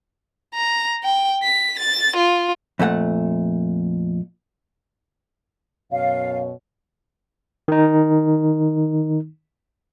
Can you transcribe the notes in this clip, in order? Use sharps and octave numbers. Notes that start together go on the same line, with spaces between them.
A#5
G5
B6
A6
F4
F2 A#2 A3 F#5
F#2 B2 C#5 F5
D#3 D#4